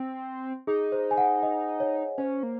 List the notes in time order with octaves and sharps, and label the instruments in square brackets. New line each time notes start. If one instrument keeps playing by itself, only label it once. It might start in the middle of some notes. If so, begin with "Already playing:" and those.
Already playing: [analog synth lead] C4
[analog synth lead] D#4 [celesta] G#4
[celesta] C5
G#5
F#5
D#5
C#5
[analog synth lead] C#4 [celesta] C5
[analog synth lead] A#3